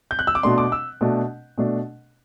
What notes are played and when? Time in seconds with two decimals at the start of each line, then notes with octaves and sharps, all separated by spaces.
0.11 G6
0.19 F#6
0.27 E6
0.35 D6
0.43 B2 A3 D4 C6
0.58 D6
0.72 E6
1.01 B2 A3 D4
1.58 B2 A3 D4